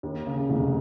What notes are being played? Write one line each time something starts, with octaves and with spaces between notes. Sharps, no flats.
D#2
C#3
F1